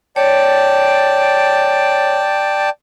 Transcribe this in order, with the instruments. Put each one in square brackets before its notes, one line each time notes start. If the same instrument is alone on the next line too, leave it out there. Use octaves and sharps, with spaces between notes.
[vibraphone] C#5 [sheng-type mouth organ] D5 G5 A5